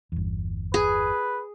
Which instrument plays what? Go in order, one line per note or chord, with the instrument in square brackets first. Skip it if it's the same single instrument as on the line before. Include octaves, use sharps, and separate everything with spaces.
[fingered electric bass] G1 E2
[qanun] G#4 [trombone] B4